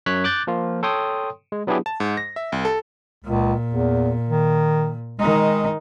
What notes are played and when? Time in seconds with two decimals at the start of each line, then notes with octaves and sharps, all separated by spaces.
0.06 F#2 C#5 F#6 B6
0.24 D6 F#6 G6 A6
0.47 F3 A#3 F4
0.83 A4 C#5 G5 C6 D#6
1.52 G#3
1.67 F#3 B3 D4 E4 G4 G#4
1.86 A5
2.00 G#2
2.17 A#6
2.36 E5
2.52 C2
2.65 A4
3.25 C#2 A#2
3.71 E2
4.30 D#3
5.20 D#3 G#3 D#4